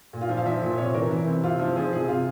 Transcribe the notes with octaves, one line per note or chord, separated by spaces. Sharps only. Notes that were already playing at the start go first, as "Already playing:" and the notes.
A#2
F4
F3
F5
F3 E5
A#2
C3 C#5
E3 A#4
E3 E4
C3
C3 F4
F3
F3 G#4
C3 G#4
C3 F4